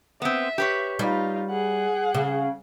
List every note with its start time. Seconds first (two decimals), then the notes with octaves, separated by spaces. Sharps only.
0.22 B3 C4 E5
0.58 G4 B4 C#5
0.99 G3 D#4 F4
1.50 G#4 F#5
2.14 C#3